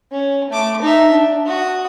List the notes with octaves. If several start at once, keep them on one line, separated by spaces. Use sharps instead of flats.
C#4
A3 D6
D#4 E5
D4
F#4 D#6